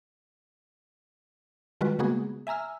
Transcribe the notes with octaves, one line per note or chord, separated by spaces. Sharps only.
D#3 G3 G#3 F4 F#4 B4
C#3 G#3 A#3 B3 F#4 G#4
E5 G#5 A#5 E6 F6